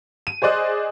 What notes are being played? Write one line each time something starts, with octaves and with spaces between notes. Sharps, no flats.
D#7
G#4 C5 D5 D#5 F#6